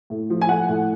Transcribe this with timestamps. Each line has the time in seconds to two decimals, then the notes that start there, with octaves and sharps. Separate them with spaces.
0.10 A2
0.30 F3
0.41 G#5
0.49 A3 F#5
0.68 A2